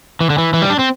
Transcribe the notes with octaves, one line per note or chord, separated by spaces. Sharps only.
E3
D3
E3
E3
G3
D4
C4